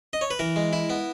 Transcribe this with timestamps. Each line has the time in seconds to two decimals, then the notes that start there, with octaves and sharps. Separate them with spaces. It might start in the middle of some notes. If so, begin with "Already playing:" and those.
0.13 D#5
0.21 C#5
0.30 B4
0.39 E3 A#4
0.56 G#3
0.73 E4
0.90 B3